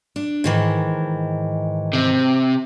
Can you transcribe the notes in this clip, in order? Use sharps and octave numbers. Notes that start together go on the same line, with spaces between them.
D4
G#2 D#3 E3
C3